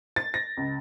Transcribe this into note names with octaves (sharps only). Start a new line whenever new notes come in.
A6
A#6
C#2